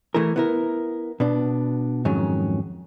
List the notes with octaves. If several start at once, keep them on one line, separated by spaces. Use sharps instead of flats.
E3 A3 E4 G#4 A#4
B3 E4 A#4
B2 B3 D4
F2 G#2 D#3 F#3 C#4